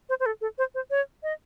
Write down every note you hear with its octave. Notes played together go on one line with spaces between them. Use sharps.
C5
C5
A4
A4
C5
C5
C#5
D#5